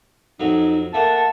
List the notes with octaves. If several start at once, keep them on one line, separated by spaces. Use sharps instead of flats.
F2 F#3 D#4
A3 A#3 F#5 A5